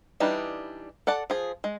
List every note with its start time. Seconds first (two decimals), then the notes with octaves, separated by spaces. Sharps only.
0.20 E3 G3 D4 D#4
1.07 A4 D5 F#5 A5
1.30 F3 G#4
1.64 G#3